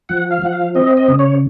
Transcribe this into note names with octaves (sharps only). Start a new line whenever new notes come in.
F3 F#5
F5
F3 F#5
F5
C4 D#5
D#5
C#3
C#5